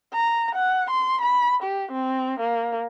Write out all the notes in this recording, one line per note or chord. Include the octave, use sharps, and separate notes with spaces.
A#5
F#5
C6
B5
G4
C4
A#3